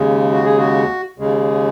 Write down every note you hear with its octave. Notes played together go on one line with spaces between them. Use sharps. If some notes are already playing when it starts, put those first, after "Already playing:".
Already playing: D#2 C#3 G#3
F#4
G#4
F#4
D#2 C#3 G#3